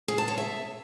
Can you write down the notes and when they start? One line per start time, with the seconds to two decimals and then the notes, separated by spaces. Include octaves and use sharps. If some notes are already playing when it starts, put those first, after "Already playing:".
0.08 G#4
0.18 A5
0.28 C#5
0.38 E5